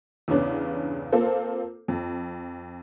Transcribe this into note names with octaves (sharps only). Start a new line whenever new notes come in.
E2 G2 C#3 B3 C#4 D4
A#3 C4 F4 A4 C5
F2